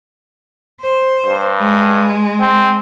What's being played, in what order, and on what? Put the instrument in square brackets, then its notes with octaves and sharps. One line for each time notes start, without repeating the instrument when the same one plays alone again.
[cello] C5
[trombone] G2
[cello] G#3
[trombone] C4